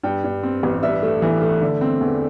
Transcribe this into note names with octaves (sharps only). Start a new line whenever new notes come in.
G2 G5
G2
C4
A1
G2 E5
A3
E3
A3
D3
C4
E2